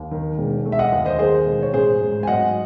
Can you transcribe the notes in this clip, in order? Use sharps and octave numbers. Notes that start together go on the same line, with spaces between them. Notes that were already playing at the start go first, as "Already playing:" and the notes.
Already playing: D#2
D#3
E1
A3
E5
D#5 F#5
D#2
C5 D#5
D#3 G#4 C5
E1
C#5
A1 G#4 C5
G#2
G#5
F#3 D#5 F#5